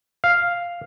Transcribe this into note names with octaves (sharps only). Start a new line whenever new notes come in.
F5